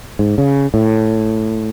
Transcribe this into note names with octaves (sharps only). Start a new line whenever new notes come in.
G#2
C#3
A2